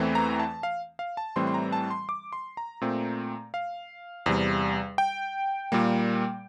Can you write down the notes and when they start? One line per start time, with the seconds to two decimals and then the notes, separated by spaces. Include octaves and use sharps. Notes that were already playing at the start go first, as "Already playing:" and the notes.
Already playing: E2 E3 A3 C4
0.15 A#5
0.39 A5
0.63 F5
0.99 F5
1.17 A5
1.36 A2 E3 G3 C4 C6
1.47 C6
1.54 A#5
1.73 A5
1.91 C6
2.09 D6
2.33 C6
2.57 A#5
2.81 A#2 A3 C4
3.54 F5
4.26 E2 C3 G3
4.98 G5
5.72 A#2 G3 A#3